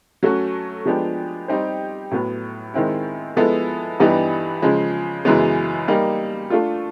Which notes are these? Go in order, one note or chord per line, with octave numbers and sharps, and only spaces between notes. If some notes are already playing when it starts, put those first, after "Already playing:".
F#3 A3 C#4 F#4
F3 G#3 B3 D4 G4
G3 C4 D#4 G4 C5
A2 F#3 B3
D#3 G#3 C4 E4
F3 G#3 B3 E4 A4
G2 E3 G3 B3 D#4
C#3 F3 G#3
F#2 C#3 E3 G#3 B3
G3 A#3 D#4
A3 D4 F4